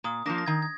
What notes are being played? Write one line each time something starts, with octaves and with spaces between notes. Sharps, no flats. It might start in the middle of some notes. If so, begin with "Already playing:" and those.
A#2 D#6
F3 A#3 D4 A#6
A#6
D#3 G#6
G#6